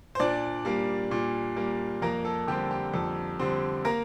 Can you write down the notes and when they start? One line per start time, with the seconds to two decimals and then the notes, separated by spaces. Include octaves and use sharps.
0.15 C5
0.19 A#2 D4 D5
0.65 G3 A#3
1.11 A#2
1.56 G3 A#3
2.02 F2 A#3 A#4
2.25 A4
2.47 D3 G3 C4 G4
2.71 G4
2.94 F2 A4
3.39 D3 G3 C4
3.85 A#3 A#4